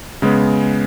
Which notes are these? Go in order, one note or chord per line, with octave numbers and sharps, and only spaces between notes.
C#3 G#3 B3